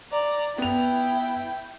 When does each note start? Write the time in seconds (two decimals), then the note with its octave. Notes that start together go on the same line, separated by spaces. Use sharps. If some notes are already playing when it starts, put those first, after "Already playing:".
0.11 D5 A#5
0.58 B3 E4 G5 F7